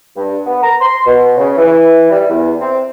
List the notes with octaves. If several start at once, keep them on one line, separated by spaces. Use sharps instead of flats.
G2
B3
A#5
C6
B2
C#3
E3
G3
E2
C4